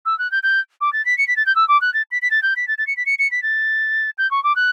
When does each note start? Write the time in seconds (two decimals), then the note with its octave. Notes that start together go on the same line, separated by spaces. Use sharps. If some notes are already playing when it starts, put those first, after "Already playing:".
0.06 E6
0.19 F#6
0.31 G6
0.43 G6
0.81 D6
0.93 A6
1.05 B6
1.18 C#7
1.28 B6
1.36 A6
1.46 G6
1.56 E6
1.68 D6
1.81 F#6
1.94 A6
2.11 B6
2.22 B6
2.31 A6
2.43 G6
2.56 B6
2.68 A6
2.78 A6
2.87 C#7
2.97 B6
3.06 C#7
3.19 C#7
3.31 B6
3.43 A6
4.18 G6
4.31 C#6
4.44 D6
4.56 F#6